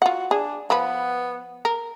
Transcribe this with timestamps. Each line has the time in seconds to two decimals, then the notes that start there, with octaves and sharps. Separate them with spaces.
0.02 F4 F#4 F#5
0.31 D4 G#4
0.70 F3 B3 B4
1.65 A#4